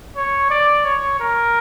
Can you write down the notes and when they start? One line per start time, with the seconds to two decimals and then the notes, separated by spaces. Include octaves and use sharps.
0.16 C#5
0.50 D5
0.85 C#5
1.20 A#4